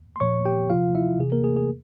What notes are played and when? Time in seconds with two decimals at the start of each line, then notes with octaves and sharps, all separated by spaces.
0.16 C6
0.20 A#2 F3 C#5 C#6
0.45 G4 G5
0.70 C3 F3 F4 F5
0.95 E4 E5
1.19 C3 E3 G#4
1.32 A#3 A#4
1.44 G#4
1.57 G#4